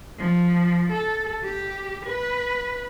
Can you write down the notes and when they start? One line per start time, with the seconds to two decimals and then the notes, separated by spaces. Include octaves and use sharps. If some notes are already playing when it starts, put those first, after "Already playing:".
0.18 F3
0.92 A4
1.44 G4
2.05 B4